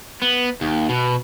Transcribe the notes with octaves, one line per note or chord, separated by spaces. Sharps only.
B3
D#2
B2